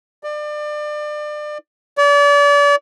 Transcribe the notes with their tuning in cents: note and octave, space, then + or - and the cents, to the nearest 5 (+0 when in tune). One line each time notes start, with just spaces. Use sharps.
D5 +30
D5 -35